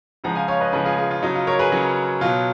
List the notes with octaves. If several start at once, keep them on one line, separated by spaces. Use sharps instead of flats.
C#3 F3 G#3 F#5 A#5
F5 G#5
C#5 F5
B4 D#5
C#3 F3 G#3 G#4 B4
F4 G#4
F4 G#4
F4
C#3 F#3 D#4
F4
A#4 C#5
G#4 B4
C#3 F#3
B2 F#3 F4